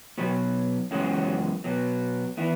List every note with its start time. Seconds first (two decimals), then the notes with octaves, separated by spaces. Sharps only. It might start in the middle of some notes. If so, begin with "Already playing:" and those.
0.18 B2 F#3 B3 F#4 B4
0.91 F#2 C#3 E3 G#3 B3 C#4 F#4
1.64 B2 F#3 B3
2.37 E3 B3 E4